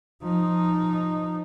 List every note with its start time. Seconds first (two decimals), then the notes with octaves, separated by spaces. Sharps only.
0.22 F3 D#4